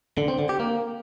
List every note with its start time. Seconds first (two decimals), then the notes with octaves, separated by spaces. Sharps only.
0.18 D3
0.28 C4
0.39 D3
0.49 G4
0.60 A#3